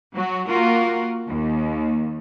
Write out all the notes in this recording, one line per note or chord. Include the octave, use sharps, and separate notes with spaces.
F#3 F#4
A#3 F4 F#4 A#4
D#2